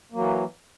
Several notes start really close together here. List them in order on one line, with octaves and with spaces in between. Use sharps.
A#3 F#3 E3